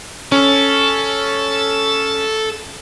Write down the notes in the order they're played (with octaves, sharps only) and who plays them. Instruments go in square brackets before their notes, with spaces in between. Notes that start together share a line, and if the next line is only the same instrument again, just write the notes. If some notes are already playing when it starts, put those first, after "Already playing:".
[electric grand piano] C#4 [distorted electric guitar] A4